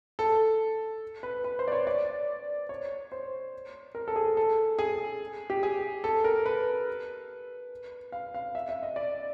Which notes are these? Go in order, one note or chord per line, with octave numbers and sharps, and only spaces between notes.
A4
B4
B4
C5
D5
C#5
D5
C#5
C5
A#4
A4
G#4
A4
G#4
G4
G#4
A4
A#4
B4
F5
F5
E5
E5
D#5
D5